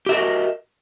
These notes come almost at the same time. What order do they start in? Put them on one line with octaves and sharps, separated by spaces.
G4 E5 A#4 D#5 F#4